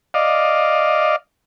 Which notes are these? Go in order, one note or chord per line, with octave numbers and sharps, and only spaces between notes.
D5 D#5 F5